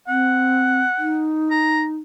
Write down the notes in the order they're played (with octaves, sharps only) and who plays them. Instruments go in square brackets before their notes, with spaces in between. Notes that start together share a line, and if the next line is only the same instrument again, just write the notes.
[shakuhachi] C4 [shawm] F#5
[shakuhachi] D#4
[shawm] A#5